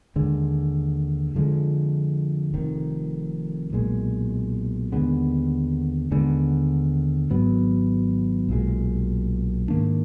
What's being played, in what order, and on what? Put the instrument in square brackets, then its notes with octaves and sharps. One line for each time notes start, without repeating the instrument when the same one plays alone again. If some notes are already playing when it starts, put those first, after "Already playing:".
[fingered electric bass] D#2 D3 G#3
F2 D3 F3 G#3
F1 F2 D#3
B1 A#2 G#3
D#2 D3 G#3 B3
D#2 D3 G#3 B3
G#1 G#2 F#3 B3
B1 A#2 G#3
G#2 D#3 A#3 D4